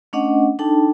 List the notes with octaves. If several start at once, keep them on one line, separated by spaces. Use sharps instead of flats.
A3 C#4 D4 D#5 F#5
D4 D#4 A4 G5 A5